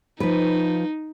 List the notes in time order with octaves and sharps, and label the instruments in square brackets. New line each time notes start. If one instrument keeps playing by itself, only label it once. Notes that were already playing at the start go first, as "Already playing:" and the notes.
[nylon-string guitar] F3 B4 [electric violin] D#4